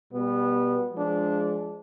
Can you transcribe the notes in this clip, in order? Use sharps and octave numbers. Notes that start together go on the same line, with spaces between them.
B2 G3 B3
F3 G#3 D4